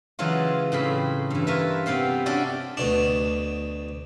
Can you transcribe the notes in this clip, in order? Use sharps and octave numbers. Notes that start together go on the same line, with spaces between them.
C#3 E3 F#3 G#3 F4
A2 C#3 C4 B5
G2 E3
F4 A#4 B4 C#5 E5
C3 B3 C4 F5 G5
C#4 D4 F#4 D5 E5 G5
D2 B2 D4